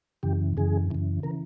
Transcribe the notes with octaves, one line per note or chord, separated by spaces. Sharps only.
F#2 C#3 E3 G4
F#2 C#3 E3 G#4
F#2 C#3 E3
C#3 E3 A#4